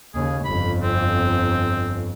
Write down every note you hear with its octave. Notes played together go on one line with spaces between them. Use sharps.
D#2 C#3 G#4
G1 F2 B5
C4